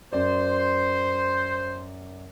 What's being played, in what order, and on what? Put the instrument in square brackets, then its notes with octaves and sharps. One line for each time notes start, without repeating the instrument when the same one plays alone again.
[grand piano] F#2 D5 [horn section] C5